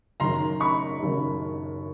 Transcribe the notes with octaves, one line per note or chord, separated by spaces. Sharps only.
F#1 F#2 D#3 A#5 C6
B5 C#6
F#1 F#2 D#3